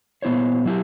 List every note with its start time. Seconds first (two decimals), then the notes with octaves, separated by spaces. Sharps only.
0.22 A#2 B3 E4 C5 C#5
0.65 F#3 E4 G4